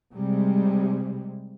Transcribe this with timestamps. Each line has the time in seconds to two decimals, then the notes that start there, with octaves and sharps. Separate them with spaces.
0.14 C3 G3 G#3